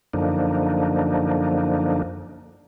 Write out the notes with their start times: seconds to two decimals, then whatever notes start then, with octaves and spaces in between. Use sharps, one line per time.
0.13 F#2 D3 F3 A#3 D4 D#4